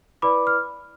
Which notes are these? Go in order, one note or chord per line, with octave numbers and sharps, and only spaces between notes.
E4 B4 D5 B5 D6
F6